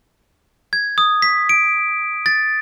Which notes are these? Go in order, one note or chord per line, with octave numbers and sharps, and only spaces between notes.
G#6
D#6
B6
D7
A6